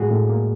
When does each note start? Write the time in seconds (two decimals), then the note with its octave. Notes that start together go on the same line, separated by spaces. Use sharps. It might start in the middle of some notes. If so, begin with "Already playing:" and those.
Already playing: A2 G#3 F#4 G#4
0.11 A2
0.30 A#3